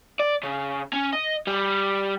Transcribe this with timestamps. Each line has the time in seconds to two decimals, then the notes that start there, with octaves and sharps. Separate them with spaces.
0.20 D5
0.43 C#3
0.93 C#4
1.13 D#5
1.47 G3